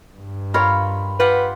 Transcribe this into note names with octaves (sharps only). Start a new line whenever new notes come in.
G2
F4 A#4 C#5 F5 G5 B5
F4 G4 B4 F#5